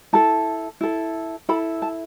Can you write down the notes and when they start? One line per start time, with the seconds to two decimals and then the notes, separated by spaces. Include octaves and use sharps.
0.13 E4 A4 A5
0.81 E4 A4
1.49 E4 A4 B5
1.82 A5